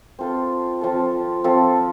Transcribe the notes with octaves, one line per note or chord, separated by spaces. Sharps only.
C4 F4 A4 C5
F3 C4 F4 A4
F3 C4 F4 A4